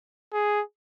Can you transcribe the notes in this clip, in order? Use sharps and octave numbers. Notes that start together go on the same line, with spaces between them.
G#4